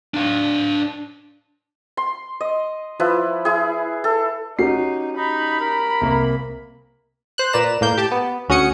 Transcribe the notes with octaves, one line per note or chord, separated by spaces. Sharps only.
D4 F5
C6
D#5
F3 E4 B4
E4 G#4
A4
C#4 D#4 F#4 G4 C7
D#4 B5
A#4
C2 A#3 C4
C5 F#6
A#2 B4 D5 A#5 E7
A2 A#3 G6
G4 A5 D6
B3
D2 C#4 F#4 D#6 C#7